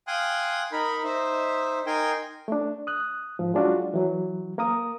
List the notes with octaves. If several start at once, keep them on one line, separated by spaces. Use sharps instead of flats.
F5 G5 G#5 C6 D#6 F#6
D#4 A#4 B5
D#4 C5 E5
D#4 A#4 G5 G#5 C6
A3 D4
D#6 F#6
G#2 F3
F#3 G#3 D4 F4 F#4
E3 F#3
A#3 A#4 D#6